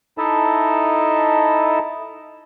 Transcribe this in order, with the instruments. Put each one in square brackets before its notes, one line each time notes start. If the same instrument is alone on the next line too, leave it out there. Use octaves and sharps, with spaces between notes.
[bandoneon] D#4 E4 A4 D#5 E5 A5